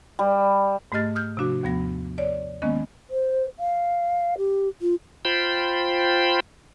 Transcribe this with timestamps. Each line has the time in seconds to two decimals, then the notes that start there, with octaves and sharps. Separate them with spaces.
0.19 G3
0.92 G#2 A3 G4 D#5 F6 A6
1.15 D#6 F6 G6
1.37 C3 F3 D4 F#4
1.63 D#2 F3 B3 A#6
2.18 C#5 D5
2.62 D#3 G#3 A#3 B3 C#4 D#5
3.10 C5
3.59 F5
4.38 G4
4.81 F4
5.25 F4 C5 G5 B5